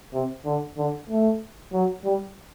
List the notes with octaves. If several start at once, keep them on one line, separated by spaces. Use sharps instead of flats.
C3
D3
D3
A3
F#3
G3